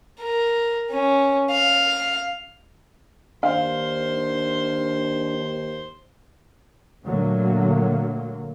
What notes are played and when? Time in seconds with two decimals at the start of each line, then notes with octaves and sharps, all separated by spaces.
0.21 A#4
0.91 C#4
1.51 F5
3.43 D#2 D4 C5 F5
7.04 A#2 D3 F#3 A3 A#3